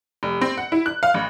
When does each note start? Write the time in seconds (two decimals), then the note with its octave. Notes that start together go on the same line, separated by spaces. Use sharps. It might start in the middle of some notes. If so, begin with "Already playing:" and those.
0.23 F1
0.41 C4
0.57 F#5
0.72 E4
0.86 F#6
1.03 F5
1.14 A1